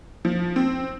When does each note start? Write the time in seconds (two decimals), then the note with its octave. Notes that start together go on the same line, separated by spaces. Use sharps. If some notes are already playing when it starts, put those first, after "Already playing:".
0.25 F3
0.56 C4